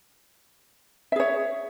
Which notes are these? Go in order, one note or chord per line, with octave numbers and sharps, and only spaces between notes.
G#4 C#5 E5